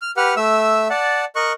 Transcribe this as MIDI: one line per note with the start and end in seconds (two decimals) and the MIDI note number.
0.02 0.11 89
0.17 0.34 67
0.17 0.34 71
0.17 0.34 78
0.17 0.34 89
0.37 0.88 57
0.37 0.88 76
0.37 0.88 88
0.90 1.25 74
0.90 1.25 78
0.90 1.25 81
1.36 1.53 70
1.36 1.53 75
1.36 1.53 85
1.36 1.53 90